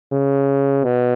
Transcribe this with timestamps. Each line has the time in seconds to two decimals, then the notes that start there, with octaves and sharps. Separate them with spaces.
0.12 C#3
0.84 B2